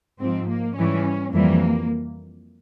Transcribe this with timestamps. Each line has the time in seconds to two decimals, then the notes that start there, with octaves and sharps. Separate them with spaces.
0.20 G#2 F3 C4
0.49 A#3
0.76 G#2 E3 G3 C#4
1.33 F2 E3 G3 A#3